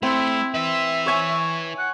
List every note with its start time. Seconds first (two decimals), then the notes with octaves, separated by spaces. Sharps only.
0.03 A3 C4 E4
0.54 E4 B4 E5
1.06 C#5 G#5
1.78 F#5